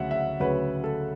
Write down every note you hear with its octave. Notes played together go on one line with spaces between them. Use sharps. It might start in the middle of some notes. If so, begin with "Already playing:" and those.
Already playing: D2 C#3 F#3 C#4 E5 F#5
E5
D2 C#3 F#3 C#4 B4
A4